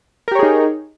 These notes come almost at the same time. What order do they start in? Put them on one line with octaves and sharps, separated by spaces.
A#4 G4 C#5 G#4 D#4